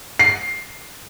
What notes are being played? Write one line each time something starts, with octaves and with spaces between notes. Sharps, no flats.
C7